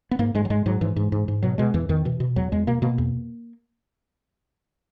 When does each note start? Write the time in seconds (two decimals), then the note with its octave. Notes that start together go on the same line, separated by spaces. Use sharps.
0.11 B3
0.19 G#2 A#3
0.35 G#2 G#3
0.45 F#3
0.50 G#2 G#3
0.66 G#2 F#3
0.81 G#2 E3
0.96 G#2
1.12 G#2
1.28 G#2
1.43 B2 F#3
1.58 B2 G#3
1.74 E2 E3
1.89 E2 D#3
2.05 B2 E3
2.20 B2
2.36 E2 F#3
2.52 E2 G#3
2.67 B2 A#3
2.82 B2 A#3
2.98 E2